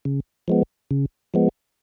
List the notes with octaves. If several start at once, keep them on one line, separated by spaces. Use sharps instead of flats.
C#3
F3 G#3 B3
C#3
F3 G#3 B3